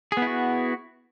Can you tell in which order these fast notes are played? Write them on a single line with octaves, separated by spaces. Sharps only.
G#4 B3 E4 F#4